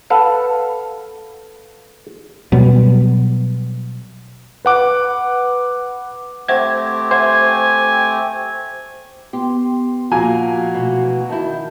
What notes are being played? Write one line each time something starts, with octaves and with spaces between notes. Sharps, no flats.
A4 B4 F5 F#5
B2 F#3 G3 B3
B4 F#5 D6
A3 C4 G4 C5 E5 F#5 G#6
C5 E5 F#5 G#5
B3 G4 C6
A#2 F3 A#3 F#4 G#5
B2 E3 A3
D#3 E4 A5 G6